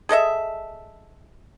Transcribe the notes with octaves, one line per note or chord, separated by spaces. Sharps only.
G#4 A4 D#5 E5